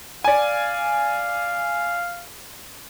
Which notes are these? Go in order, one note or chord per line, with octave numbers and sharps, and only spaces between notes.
D5 F5 G#5